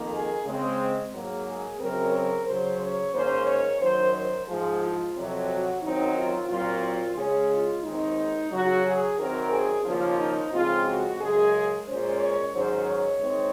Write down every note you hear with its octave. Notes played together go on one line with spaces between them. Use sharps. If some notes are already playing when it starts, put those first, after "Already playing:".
Already playing: F2 D#3 A#3
G#4
C#3 G#3 C4
G#2 F#3 A#3
G#4
F#2 C#3 F#3 C4 A#4
A#4
C#3 F#3 C#4 C5
C#5
G#2 D#3 A#3 C#4 C5
C#5
F#2 D#3 F#3 C5
C5
G#2 F3 G#3 G#4
F4
F2 C3 F#3
F#4
F#2 D#3 F#3 C4 D#4
F4
A#2 F#3 C4 F4
F4
C#3 G#3 C#4 G#4
F4
D#2 D#3 G#3 C4 D#4
C#3 F#3 C#4 F#4
G#4
F#2 D#3 F#3 C4 A#4
G#4
D#2 C#3 F3 A#3 C#4 F4
D#4
F2 C#3 G#3 C4 F4
F#4
F#2 C#3 G#3 G#4
A#2 G#3 C#4 C5
C#5
G#2 D#3 F#3 C#4 C5
C#5
D#2 D#3 G#3 C4